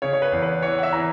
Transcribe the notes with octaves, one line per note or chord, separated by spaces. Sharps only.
C#3 C#5
C#5
B4
E2
B4
E3 C#5
F#5
E5
E3 A#5